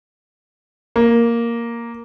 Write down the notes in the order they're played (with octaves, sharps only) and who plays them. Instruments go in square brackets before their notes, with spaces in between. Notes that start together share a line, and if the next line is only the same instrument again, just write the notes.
[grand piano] A#3